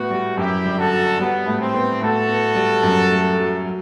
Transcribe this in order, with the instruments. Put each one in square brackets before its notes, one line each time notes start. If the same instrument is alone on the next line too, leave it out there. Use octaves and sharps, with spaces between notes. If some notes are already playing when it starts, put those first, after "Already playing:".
Already playing: [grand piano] A2 B3 [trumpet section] F#4
[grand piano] G3
[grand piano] F#2 [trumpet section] E4 G4
[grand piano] G1
[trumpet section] F#4 A4
[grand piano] F#3
[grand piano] G3 [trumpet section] B3
[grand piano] A2
[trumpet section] C4
[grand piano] B3
[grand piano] A2 [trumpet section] F#4 A4
[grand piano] B3
G3
F#2
A3
F#3
F#3